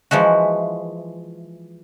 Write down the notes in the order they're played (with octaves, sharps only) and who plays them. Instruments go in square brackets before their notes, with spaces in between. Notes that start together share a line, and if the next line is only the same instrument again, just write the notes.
[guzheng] E3 F3 G#3 F#4